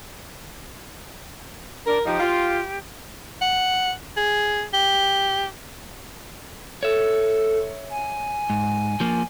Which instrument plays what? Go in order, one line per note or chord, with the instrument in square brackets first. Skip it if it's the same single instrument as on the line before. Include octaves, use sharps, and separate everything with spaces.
[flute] D4 [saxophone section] A#4
[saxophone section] F3 D#4 [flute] G4
[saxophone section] F4
[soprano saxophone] F#5
G#4
G4
[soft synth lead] A4 [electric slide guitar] C#5 E5
[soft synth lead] G#5
[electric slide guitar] G#2
F3 A#3